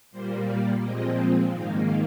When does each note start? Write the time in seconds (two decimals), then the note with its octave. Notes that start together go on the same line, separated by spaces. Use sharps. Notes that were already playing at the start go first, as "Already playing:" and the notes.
0.11 A#2 G3 A#3 C5
0.47 D5
0.81 A#2 F3 G#3 C4 D#5
1.51 G#2 D#3 A#3 F5